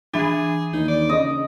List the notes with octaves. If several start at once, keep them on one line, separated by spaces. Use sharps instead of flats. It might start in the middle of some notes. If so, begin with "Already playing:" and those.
E3 D4 G#4
D#2 D#4
D5
C#3 D#5